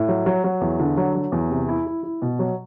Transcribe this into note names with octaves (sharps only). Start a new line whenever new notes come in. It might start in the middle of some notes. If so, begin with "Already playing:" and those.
Already playing: A2
F#3
F#3
F#3
E2
D3
F#3
F#3
E2
C3
E4
E4
E4
B2
F#3